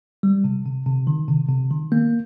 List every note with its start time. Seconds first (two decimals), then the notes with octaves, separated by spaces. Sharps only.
0.23 G3
0.44 C3
0.65 C3
0.86 C3
1.07 D#3
1.29 C3
1.49 C3
1.71 D#3
1.92 A#3